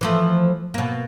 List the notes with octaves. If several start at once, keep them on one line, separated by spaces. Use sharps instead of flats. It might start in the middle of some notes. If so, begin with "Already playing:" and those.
E3 F3 A3
B2 A#3